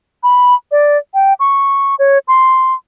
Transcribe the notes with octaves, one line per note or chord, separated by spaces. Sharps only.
B5
D5
G5
C#6
C#5
C6